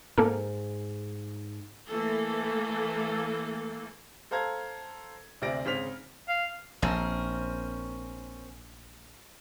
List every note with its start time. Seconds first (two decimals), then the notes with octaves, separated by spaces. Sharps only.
0.18 G#2 A#3 A4 A#4
1.87 E3 A3 A#3 A4
4.31 A4 C5 F5 A#5 G#6
5.42 D2 C3 C4 D5 A#6 D7
5.65 G#1 C#3 C5 F6 B6 F7
6.28 F5
6.82 A#1 C4 C#4 A#4